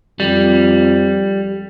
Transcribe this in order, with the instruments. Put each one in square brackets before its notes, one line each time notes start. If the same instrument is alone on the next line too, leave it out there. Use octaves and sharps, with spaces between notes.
[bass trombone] F2 [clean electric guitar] G3